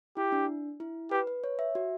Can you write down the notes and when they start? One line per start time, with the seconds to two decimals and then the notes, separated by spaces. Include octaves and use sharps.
0.17 E4 G4
0.32 D4
0.80 E4
1.11 G4 B4
1.27 B4
1.44 C#5
1.59 E5
1.75 F#4